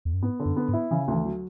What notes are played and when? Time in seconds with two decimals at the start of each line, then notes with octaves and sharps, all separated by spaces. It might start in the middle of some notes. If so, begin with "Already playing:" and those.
0.05 E2
0.13 F#2
0.22 G#2 B3
0.40 D3
0.46 F#2
0.57 B3
0.68 G#2
0.73 E4
0.91 C#3 E3
1.08 D2
1.14 E3
1.25 F#3